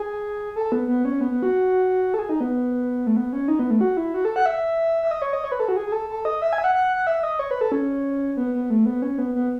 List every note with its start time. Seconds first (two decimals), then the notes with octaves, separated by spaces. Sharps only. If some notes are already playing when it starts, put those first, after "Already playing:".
Already playing: G#4
0.56 A4
0.72 B3
0.88 B3
1.05 C#4
1.21 B3
1.31 B3
1.43 F#4
2.14 A4
2.19 G#4
2.29 D#4
2.40 B3
3.07 A3
3.16 B3
3.33 C#4
3.48 D#4
3.59 B3
3.71 A3
3.81 F#4
3.97 E4
4.14 F#4
4.25 A4
4.36 F#5
4.46 E5
5.02 E5
5.11 D#5
5.22 C#5
5.33 D#5
5.44 C#5
5.52 B4
5.60 A4
5.68 F#4
5.76 G#4
5.87 G#4
5.92 A4
6.09 A4
6.25 D#5
6.42 E5
6.53 G#5
6.58 E5
6.64 F#5
6.74 F#5
6.96 F#5
7.07 E5
7.23 D#5
7.39 C#5
7.51 B4
7.61 A4
7.72 C#4
8.37 B3
8.54 B3
8.70 A3
8.86 B3
9.02 C#4
9.18 B3
9.35 B3